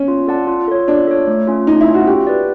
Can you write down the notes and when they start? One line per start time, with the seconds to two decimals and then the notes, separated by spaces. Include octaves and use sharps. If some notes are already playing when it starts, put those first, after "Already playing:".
Already playing: C#4
0.08 F4
0.27 A4 D5 F#5 A5
0.47 F4
0.68 A4 C#5
0.88 D4 F4
1.07 A4 C#5
1.27 A3
1.47 C#4 F4
1.67 A3 D#4
1.81 E4
1.88 C#4 F4
1.94 F#4
2.07 F#4 G4
2.27 B4 D5